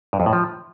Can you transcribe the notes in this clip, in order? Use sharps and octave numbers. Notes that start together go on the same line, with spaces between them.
G2
F2
A2
F3